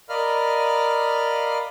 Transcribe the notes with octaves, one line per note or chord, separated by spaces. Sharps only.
A#4 D5 D#5 F5 B5 F6